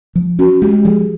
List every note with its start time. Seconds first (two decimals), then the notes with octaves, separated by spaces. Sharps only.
0.15 F3
0.39 C#4 F#4
0.62 G#3 G4
0.85 F3 G#4